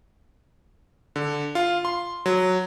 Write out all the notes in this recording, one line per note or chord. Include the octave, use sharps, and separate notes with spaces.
D3
F4
C6
F#3